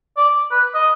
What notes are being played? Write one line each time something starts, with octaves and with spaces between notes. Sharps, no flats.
D5
B4
D#5